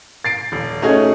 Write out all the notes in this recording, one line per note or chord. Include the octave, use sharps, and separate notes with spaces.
A6 C7 D7
D#1
A3 C#4 D#4 F#4 G#4